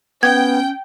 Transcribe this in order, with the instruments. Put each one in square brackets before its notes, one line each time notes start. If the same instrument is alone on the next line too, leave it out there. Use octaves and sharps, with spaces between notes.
[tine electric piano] B3 [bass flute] C#4 [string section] G5 [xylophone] G#6